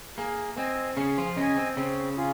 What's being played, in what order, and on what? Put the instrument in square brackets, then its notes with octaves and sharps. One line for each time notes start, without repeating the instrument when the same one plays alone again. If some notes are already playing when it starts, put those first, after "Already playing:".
[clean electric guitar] A#3 [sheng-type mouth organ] G#4
[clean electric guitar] C4 [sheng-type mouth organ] D#5 G#5
[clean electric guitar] C#3 C#4 [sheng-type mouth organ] G#4
[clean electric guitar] F3 F4
[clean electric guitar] C#3 C#4 [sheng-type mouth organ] D#5 G#5
[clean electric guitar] C4
[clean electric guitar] C#3 C#4 [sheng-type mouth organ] C4
[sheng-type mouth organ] F4 G#4